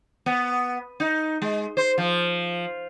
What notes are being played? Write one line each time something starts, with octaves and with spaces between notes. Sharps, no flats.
B3
D#4
G#3
C5
F3